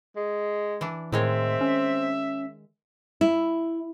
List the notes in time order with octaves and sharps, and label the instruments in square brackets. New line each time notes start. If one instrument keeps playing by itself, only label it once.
[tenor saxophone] G#3
[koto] E3 D4
[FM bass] A2 [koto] D#3 G#3 C#5 [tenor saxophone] C4 [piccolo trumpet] E5
[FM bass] C#4
[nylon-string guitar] E4